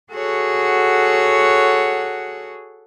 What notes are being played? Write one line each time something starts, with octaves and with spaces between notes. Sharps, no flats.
F#4 G#4 A4 C#5 F#5